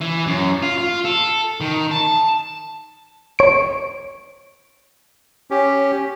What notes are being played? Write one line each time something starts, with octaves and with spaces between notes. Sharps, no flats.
E3
F#2
F4
F4
A4
D#3
A5
C#5 D7
C#4 G4